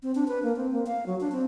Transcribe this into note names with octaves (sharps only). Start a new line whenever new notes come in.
C4
D4
B4
A#3
C4
A#3
F5
F#3
D4
C4